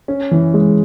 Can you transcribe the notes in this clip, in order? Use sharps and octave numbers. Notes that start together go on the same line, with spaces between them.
C#4
E3
G#3